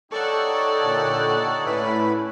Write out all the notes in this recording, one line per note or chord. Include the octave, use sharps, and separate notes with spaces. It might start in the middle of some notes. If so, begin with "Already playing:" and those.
D#4 G4 A4 C#5 D5 F#5 C#6
A#2 D3
A2 C#4 E4 B4 B5